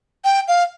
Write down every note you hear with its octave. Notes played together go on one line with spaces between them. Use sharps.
G5
F5